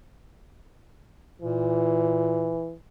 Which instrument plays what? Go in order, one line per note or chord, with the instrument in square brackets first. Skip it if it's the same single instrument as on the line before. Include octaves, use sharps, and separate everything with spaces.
[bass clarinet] A#2 [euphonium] E3